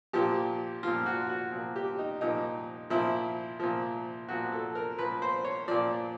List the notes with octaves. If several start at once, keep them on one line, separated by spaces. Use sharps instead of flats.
A#2 F3 G4
A#2 F3 F4
F#4
F#4
A#2 F3
G4
D#4
A#2 F3 D#4
A#2 F3 E4
A#2 F3
A#2 F3 F#4
A4
A#4
A#2 F3 B4
C5
C#5
A#2 F3 D5